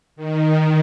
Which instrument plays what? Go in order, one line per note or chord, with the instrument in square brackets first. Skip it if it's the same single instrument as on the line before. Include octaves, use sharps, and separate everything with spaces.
[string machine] D#3